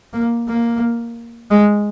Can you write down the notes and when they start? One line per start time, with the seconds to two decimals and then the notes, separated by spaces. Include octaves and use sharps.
0.13 A#3
0.48 A#3
1.51 G#3